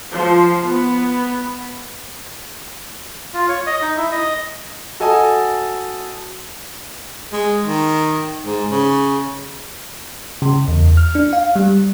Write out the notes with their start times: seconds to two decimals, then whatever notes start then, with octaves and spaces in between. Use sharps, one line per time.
0.13 F3
0.65 B3
3.34 F4
3.49 C#5
3.67 D#5
3.82 D#4
3.97 E4
4.12 D#5
5.00 F#4 A4 D#5 G#5 A5 D#6
7.32 G#3
7.65 D#3
8.44 G#2
8.71 C#3
10.42 C#3
10.68 E2
10.97 F6
11.15 D4
11.33 F5
11.56 G3